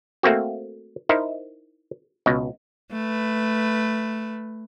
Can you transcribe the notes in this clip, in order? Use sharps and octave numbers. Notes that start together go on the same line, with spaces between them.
A3 A#3 C4 F#4
D#4 E4 A#4 C5
C#2 B2
A3 B4